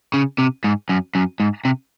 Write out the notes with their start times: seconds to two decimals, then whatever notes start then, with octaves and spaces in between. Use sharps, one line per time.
0.14 C#3
0.38 C3
0.64 G#2
0.89 F#2
1.15 F#2
1.40 G#2
1.65 C3